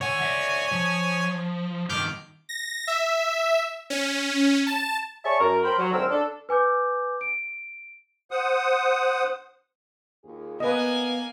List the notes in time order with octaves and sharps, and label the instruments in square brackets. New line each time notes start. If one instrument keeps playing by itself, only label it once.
[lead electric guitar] D#3 F#5 [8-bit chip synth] C#5 G#5
[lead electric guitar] D5 E5
F3
[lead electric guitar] G2 D#3 [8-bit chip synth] D6 F6 G6
[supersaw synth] A#6
E5
C#4
A5
[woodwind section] G#4 C#5 D5 E5 A5 C#6
F#2 A#4
A#4 C5 G5 B5
F#3
D2 D#3 G#3 C4 A#4 E6
D4 A4
[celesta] B4 G#5 D6 G6
D7
[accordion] C5 F#5 D#6
[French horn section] D#2 F4 G#4
[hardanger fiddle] A#3 G#5 [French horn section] B3 [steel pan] B4 D#5